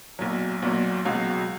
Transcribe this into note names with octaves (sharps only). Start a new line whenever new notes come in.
B1 A#2 F#3
B1 A#2 F#3
C#2 B2 F#3